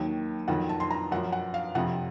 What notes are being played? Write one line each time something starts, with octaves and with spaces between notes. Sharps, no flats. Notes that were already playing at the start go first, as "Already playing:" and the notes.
Already playing: D#2 D#3 F#3
F2 D#3 F#3 F#5
A5
C6
A#5
F#2 F3 F#5
F#5
F5
F2 C3 F3 F#5